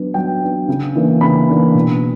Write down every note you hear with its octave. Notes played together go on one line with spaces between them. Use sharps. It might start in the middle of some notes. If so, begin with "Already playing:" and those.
Already playing: F#3 B3 D4
F#3 G5
B3 D4
C#3
E3 A#3 D4
C#3 B5
E3 A#3 D4
B2